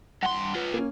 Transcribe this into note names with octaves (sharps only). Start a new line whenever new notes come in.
G2 F#5 C6
F4 B4
A#3 C#4